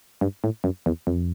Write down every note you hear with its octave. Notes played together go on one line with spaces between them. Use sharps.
G2
A2
F#2
E2
F2